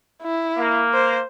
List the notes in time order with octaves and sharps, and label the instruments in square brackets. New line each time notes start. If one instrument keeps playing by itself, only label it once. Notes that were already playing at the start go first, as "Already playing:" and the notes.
[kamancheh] E4
[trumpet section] A#3
[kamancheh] C5